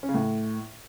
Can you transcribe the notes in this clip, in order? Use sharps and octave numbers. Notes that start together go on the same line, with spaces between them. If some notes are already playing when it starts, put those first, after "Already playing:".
C#4
C#3
A2